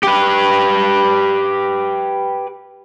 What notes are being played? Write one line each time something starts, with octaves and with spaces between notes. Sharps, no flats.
G4 B4